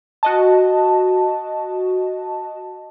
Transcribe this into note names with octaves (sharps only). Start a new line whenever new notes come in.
F#4 D#5 A5